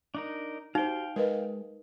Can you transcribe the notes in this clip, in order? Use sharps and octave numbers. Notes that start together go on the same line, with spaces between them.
D4 D#4 A#4
D#4 F#4 G4 C5 F5 G5
G#3 A#4 B4 D#5